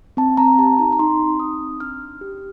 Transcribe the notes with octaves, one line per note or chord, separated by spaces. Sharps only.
C4 A5
C4 A#5
G4 A5
D#4 A#5
A#5
D#4 C6
C4
D#4 D#6
C4
D4 F6
D4
G4